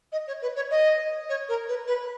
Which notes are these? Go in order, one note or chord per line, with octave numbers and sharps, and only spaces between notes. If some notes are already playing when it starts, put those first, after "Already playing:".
D#5
C#5
B4
C#5
D#5
C#5
A#4
B4
B4